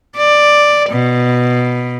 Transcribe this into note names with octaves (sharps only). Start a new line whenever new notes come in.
D5
B2